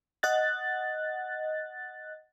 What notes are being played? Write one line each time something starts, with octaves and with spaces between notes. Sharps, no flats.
D#5 F#5 F#6 A6